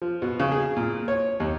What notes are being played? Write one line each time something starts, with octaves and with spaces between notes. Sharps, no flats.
F3
B2
C#3
G#4
A#2
C#5
D#2